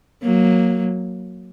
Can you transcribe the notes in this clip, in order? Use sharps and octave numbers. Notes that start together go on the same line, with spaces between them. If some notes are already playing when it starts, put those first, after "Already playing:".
F#3 A#3